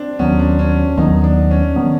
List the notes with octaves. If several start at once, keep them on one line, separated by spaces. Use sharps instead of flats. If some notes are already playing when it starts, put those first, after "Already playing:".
Already playing: C4 D4
D#2 D#3 F#3 B3 C#4
D4
C#4
D#2 D#3 F#3 B3 D#4
D4
C#4
D#3 F#3 B3